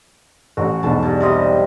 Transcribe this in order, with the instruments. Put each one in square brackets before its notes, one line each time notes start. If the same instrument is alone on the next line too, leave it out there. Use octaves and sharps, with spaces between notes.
[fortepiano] A1 [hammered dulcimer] F#4
[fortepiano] B1 E2 G#2 [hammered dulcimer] A5
[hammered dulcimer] G2
C3 G3 D#5